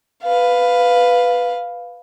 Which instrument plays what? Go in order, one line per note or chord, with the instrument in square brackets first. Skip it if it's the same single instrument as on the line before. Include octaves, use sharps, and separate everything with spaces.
[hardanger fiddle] B4 F5